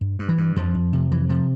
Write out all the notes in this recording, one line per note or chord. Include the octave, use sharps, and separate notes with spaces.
G2
G2
E3
G2
F2 F3
F2
C3
F2 E3
C3 F3